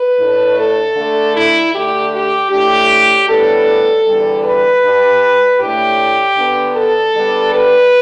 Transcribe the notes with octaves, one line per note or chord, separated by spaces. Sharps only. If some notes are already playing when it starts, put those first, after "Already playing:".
Already playing: B4
A2 A3 D4
A4
D3 A3 D4
E4
D3 A3 D4 G4
G4
A2 A3 D4 G4
A2 G3 B3 D4 A4
E2 D3 G3
B4
G2 G3 D4
A2 A3 D4 G4
D3 B3 D4
A4
D3 G3 B3 D4
B4